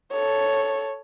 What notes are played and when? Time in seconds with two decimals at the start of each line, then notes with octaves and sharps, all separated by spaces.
0.12 A4 C#5